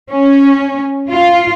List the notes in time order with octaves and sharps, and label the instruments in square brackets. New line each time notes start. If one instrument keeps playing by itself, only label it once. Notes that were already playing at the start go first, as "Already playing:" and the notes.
[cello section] C#4
F4